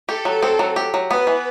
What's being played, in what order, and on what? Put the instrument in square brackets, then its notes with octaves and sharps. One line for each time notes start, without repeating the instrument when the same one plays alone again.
[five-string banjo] G4 [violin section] A4
[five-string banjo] F#3
C4
F#3
G4
F#3
[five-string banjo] B3 [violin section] B4
[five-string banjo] E3